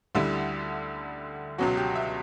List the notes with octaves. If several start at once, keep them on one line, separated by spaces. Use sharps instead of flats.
D2 D3 G3 E4
C#2 B2 F#3 F#4
G4
E5